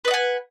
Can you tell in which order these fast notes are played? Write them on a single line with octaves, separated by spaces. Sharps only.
B4 D#5 F#5 G#5